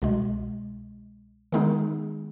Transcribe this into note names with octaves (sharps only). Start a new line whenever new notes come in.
C2 B2 G#3
D#3 G#3 B3 D#4 G#4